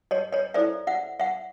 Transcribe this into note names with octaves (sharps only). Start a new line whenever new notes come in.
C#5 D#5
C#5 D#5
E4 A4 C5 D5 E5
E5 F#5
E5 F#5